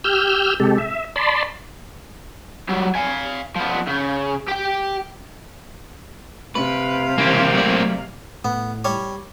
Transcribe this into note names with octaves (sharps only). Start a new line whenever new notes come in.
G4 E6 F6 G6
C3 G#3 G4 A4
E5
D5 A5 B5 C6
F#3 G3
F5 G#5
F3 B3
C#3
G4 G5
C3 B4 F5
C#3 E3 A#3 C4 G4
F#3 A3 D5
A2 B3
G3 C#5